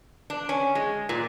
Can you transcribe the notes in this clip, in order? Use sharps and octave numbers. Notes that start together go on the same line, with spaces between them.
D4
C#4
G#3
A#2